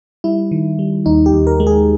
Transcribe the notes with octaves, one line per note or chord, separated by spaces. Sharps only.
G3 E4
D#3
G3
D#2 D#4
G4
D#2
A#4
G#3
G#4